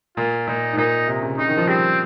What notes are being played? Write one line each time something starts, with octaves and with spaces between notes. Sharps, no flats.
A#2 F4
A#2 D#4
G#2
A#2 D#4
C3
C#3
C#3 D#4
D#3
F3
G3 C4